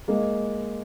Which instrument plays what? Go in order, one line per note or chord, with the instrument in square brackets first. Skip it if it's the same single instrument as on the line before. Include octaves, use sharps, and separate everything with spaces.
[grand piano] G#3 A#3